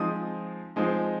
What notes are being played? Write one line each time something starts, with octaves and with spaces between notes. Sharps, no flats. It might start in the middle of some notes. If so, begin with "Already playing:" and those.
Already playing: F3 G#3 C4 D#4 D#6
F3 G#3 C4 D#4